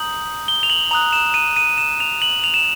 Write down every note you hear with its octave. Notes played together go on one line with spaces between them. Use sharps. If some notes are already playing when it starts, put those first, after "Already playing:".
Already playing: A#5 D#6 G6 F#7
G7
F7
F#7
A#5 D#6 F#6 F7
E7
D#7
D#7
E7
F7
F#7
F7
E7